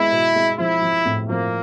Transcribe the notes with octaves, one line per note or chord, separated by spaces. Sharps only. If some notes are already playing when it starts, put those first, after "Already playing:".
Already playing: G#3 B3 E4
B2
G#3
F3 E4
F3
A2
F3 A#3